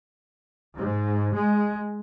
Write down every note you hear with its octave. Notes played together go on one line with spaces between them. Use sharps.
G#2
G#3